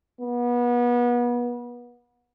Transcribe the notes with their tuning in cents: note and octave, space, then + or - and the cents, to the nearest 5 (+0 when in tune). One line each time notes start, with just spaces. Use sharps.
B3 -30